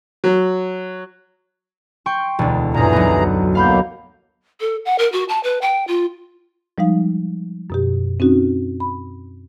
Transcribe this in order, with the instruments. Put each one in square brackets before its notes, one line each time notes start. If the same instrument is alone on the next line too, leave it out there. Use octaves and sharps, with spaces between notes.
[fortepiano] F#3
[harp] G5 C6 C#6
E1 D2
[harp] F#2 A#2 [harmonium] E3 G#4 A#5
[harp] B1 B3
[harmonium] B2 F#3 A#3 [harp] F5 B5 G6
[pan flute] A4
F#5
A#4
F#4
A5
B4
G5
F4
[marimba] F3 G3 G#3 D#4 F5
F#2 B2 G4
C4 C#4 D#4 F#4
B5